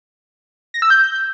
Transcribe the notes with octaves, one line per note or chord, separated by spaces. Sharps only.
A#6
E6
G6